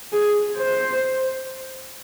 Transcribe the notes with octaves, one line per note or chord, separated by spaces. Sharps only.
G#4
C5